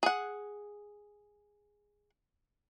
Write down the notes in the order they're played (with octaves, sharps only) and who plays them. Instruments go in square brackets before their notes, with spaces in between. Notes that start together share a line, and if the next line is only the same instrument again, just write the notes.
[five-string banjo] G#4 F#5